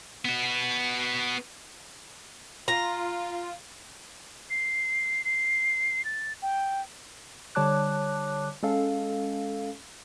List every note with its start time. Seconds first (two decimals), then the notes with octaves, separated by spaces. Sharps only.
0.25 B3 F#4
2.68 F4 A#5
4.50 C7
5.25 C7
6.05 A6
6.42 G5
7.55 D3 G3 C#5 A5 D6 F#6
8.63 G#3 C#4 A4 F5